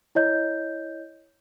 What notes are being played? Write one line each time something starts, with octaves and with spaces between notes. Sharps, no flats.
E4 C#5 D#5 G6